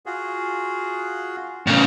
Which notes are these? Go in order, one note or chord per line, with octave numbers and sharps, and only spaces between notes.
F4 F#4 G#4
A2 C#3 D#4 F5